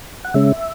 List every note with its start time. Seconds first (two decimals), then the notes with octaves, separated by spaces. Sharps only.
0.25 F#5
0.34 C#3 G#3 C#4 E5